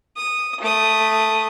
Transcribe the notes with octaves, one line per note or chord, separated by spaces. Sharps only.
D#6
A3 D#6